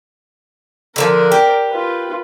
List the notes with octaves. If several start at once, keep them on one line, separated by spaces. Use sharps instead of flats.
D3 E3 F3 A#4 D5
G4
F4 B4